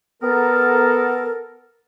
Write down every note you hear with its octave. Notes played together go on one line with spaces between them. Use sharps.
B3 A4 A#4